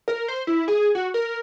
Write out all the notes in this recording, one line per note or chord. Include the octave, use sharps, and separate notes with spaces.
A#4
C5
E4
G#4
F#4
A#4